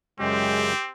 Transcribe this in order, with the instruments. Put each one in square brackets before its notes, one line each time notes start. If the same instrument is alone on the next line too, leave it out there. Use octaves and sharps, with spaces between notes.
[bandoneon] F#2 C#3 [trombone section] G#3 [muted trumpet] C4 [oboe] G4